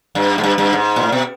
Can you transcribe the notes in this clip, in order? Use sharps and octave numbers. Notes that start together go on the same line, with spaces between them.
G2
G#2
G2
G2
G#2
A#2
A2
B2